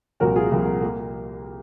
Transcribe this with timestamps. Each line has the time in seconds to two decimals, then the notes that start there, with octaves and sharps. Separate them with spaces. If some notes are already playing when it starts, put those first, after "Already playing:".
0.20 C2 A#2 F3 A#3 F#4 A#4
0.35 F4 G#4
0.51 C2 A#2 F3 A#3
0.82 A#3